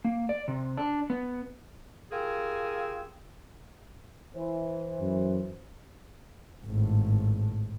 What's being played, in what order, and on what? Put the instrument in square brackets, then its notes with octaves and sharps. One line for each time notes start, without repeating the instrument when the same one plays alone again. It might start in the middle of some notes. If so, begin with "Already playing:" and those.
[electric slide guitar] A#3
D5
C3
D4
B3
[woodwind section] F4 G4 G#4 A#4 G#5 E6
[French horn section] E3 C5
[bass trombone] F#2
[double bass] G#1 A2